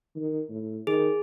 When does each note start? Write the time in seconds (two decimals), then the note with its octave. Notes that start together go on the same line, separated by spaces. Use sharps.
0.16 D#3
0.49 A2
0.87 D#3 G#4